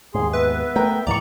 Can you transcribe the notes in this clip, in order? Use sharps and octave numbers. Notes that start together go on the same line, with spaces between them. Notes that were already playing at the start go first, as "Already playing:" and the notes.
D#2 G#2 G#4 C6
B3 B4 E5
A3 A#4 G5
C#2 G#2 E3 D5 A#5 C#6